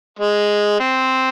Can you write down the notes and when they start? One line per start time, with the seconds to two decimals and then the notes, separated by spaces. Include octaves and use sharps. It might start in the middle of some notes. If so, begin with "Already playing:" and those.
0.19 G#3
0.80 C4